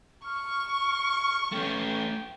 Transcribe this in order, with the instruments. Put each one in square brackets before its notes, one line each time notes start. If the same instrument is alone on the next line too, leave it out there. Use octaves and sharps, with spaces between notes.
[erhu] C#6 [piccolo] F6
[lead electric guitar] A3 C#4 [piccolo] G5